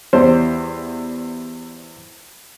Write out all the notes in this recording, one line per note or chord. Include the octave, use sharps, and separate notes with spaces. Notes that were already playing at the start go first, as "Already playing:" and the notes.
E2 G3 C5